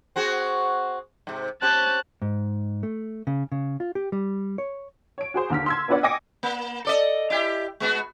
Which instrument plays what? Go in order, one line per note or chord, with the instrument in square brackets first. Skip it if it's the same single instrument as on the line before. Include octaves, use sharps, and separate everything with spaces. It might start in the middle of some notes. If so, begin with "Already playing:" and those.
[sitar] C4 F#4 G#4
G#2 C3
[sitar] C4 C#4 G4 [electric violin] A5 F#6
[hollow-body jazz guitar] G#2
A3
C#3
C#3
F4
G4
G3
C#5
[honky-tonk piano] C#5 D7
F#4 G#4 C5
D#2 D3 F6 B6
C6 E6 G#6
B3 D4 F4 B4 D5 F#5
D#5 G5 G#5 D6 A#6 C#7
[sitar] A#3
A4 D5 D#5
E4 G4
G#3 B3 F#4